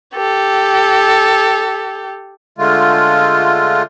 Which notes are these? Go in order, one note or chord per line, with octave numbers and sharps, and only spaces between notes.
G4 A4
D3 G#3 A3 F4